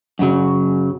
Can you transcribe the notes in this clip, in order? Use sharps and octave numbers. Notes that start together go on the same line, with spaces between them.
F#2 C#3 F#3